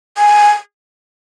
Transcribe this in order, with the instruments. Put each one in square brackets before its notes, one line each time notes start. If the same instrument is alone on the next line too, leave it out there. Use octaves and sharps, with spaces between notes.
[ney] G#5